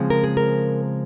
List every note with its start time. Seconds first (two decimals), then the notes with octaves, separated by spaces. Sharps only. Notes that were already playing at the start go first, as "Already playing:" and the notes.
Already playing: C#3 F3 G#3 C4
0.10 A#4
0.24 G#4
0.37 A#4